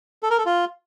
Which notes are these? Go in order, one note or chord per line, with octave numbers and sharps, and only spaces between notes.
A4
A#4
A4
F4